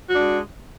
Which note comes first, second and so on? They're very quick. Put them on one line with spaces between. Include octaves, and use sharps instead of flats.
F#4 D4 G#3